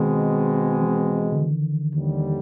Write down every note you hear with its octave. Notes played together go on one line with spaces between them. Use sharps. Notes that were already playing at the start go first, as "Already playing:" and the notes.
Already playing: B2 D#3 G#3 C4
E3
D3
D#3
D#2 D3 G3